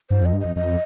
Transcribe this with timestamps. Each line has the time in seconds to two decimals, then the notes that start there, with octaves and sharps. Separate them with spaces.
0.10 G2 C5
0.22 F2 D#5
0.33 G2
0.40 F2 D#5
0.56 F2 D#5